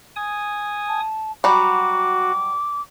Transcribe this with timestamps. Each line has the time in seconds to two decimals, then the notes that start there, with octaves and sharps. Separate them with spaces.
0.16 G#5 D#6
0.88 A5
1.44 F#3 G3 F#4 D6